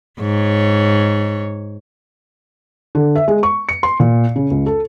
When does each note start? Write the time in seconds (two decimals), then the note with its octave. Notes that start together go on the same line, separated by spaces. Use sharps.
0.20 G#2 C#5
2.95 D3
3.16 E5
3.28 G#3
3.43 C#6
3.69 C#7
3.83 C6
4.00 A#2
4.36 C#3
4.51 C#2
4.66 A4